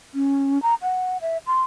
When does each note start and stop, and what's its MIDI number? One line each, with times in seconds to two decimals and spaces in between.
0.15 0.61 61
0.62 0.75 82
0.82 1.17 78
1.22 1.38 76
1.47 1.62 84